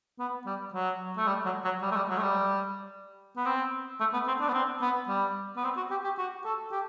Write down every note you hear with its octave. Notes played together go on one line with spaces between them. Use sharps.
B3
G3
F#3
A3
G3
F#3
F#3
G3
A3
G3
F#3
A3
G3
B3
C4
A3
B3
C4
D4
B3
C4
B3
G3
B3
C4
F#4
G4
G4
F#4
A4
G4